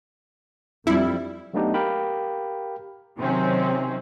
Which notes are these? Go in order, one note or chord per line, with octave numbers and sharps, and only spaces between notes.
F2 G3 C4 D4 E4 F4
F#3 A3 B3 D4 D#4 G4
G4 A#4 F5 G5 B5
C3 D#3 F#3 C4 C#4